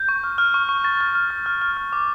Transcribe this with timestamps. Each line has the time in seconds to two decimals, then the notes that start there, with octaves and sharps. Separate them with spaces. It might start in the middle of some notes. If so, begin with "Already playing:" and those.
Already playing: G6
0.09 C#6
0.24 F6
0.38 F6
0.54 C#6
0.69 C#6
0.84 C#6 A6
1.01 F6
1.15 F6
1.30 F6
1.46 F6
1.62 F6
1.77 F6
1.93 D6